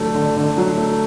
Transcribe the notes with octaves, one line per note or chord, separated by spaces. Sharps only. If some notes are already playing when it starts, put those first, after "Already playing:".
Already playing: D3 F#3 A3
D3
D3
F#3
A3